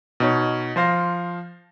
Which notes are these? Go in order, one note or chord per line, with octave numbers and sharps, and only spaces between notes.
B2 D#4 C#5
F3 C5 F5 A#6